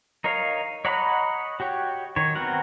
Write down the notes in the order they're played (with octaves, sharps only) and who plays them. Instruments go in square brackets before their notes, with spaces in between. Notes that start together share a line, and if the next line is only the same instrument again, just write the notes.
[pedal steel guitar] D#4 A#4 C#5 F5
C#5 D#5 F#5 A#5 B5
F#4 G4 C#5
D#3 C#5
B3 C4 F#4 A#4 F#5